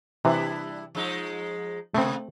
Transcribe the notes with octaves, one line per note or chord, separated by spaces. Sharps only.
C3 E3 G3 D4 E4
F3 G#3 D#4
C3 A3 A#3 C4